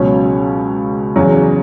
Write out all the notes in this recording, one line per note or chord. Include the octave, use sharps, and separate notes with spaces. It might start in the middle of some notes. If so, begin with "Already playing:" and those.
Already playing: C#2 B2 F#3 C#4
E2 C#3 F#3